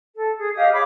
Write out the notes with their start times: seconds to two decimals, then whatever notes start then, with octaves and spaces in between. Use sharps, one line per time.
0.16 A4
0.37 G#4
0.55 G4 D#5 F5 D#6
0.72 G#4 C#5 B5 D6